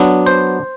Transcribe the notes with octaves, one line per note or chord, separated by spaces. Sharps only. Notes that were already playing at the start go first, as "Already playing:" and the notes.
Already playing: F#3 B3 D4
C5